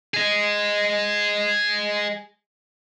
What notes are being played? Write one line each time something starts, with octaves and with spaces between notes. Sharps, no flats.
G#4 D#5